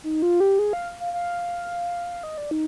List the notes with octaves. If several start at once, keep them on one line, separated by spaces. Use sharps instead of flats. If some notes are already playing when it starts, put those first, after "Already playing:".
D#4
F4
G4
G#4
F5
F5
F5
D#5
D5
D#4